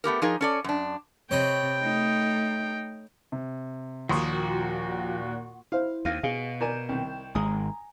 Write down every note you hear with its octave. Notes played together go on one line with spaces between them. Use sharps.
A3 B3 G4 A#4
F3 D#4 G#4 A#4
C#4 A4 D5
F#2 D4
C3 C#5 D#5 G5 B5
A3 D#4
C3
D#2 A#2 F3 F#4 C6 C#6 D#6
E4 C5 F5
D#2 F5 A#6 D#7
B2 G#4 F5
A#4 D5 G#5 G6 E7
C2 D#3
G#1 G#3 G#5 A#5 D#6